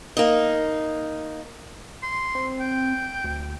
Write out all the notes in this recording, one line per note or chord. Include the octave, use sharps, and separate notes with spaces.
A#3 D#4
C6
C4
G5
D2